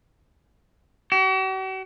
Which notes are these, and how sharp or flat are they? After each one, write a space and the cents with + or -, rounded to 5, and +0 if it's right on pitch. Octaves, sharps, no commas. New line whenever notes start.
F#4 +45